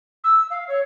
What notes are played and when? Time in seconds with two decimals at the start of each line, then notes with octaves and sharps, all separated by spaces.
0.23 E6
0.50 F5
0.68 C#5